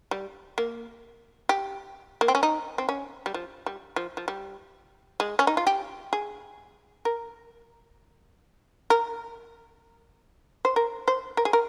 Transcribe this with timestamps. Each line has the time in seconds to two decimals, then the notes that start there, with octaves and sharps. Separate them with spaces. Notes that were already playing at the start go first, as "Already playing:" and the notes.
0.11 G3
0.58 A#3
1.49 G4
2.21 A#3
2.28 C4
2.35 C#4
2.43 D#4
2.78 C4
2.89 C#4
3.26 G3
3.34 F3
3.66 G3
3.96 F3
4.17 F3
4.28 G3
5.20 G#3
5.39 C#4
5.47 D#4
5.57 F4
5.67 G4
6.13 G#4
7.05 A#4
8.90 A#4
10.65 C5
10.76 A#4
11.08 C5
11.37 A#4
11.45 G#4
11.53 A#4